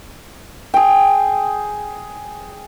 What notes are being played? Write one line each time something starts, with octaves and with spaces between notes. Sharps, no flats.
G#4 G5